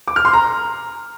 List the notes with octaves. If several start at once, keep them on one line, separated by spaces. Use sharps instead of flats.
D6
F6
C6
A#5